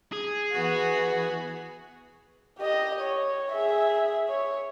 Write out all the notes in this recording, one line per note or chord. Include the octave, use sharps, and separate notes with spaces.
G#4
E3 B3 F#4
G4 D#5
C#5
G#4 E5
C#5